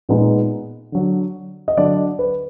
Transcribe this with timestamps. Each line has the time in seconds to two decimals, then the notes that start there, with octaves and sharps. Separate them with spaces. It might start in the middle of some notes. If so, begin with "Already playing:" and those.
0.09 A#2 G#3 B3 D#4
0.92 D3 F#3 D4
1.68 D#5
1.77 D3 F#3 D4 D5
2.19 B4